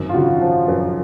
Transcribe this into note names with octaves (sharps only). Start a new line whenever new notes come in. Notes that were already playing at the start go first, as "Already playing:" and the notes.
Already playing: G#1 F#2
F4
C#3 F#4
F3
F#2